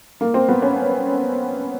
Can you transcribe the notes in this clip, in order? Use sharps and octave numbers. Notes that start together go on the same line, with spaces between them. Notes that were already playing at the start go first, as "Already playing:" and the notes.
A#3
C4
B3
C#4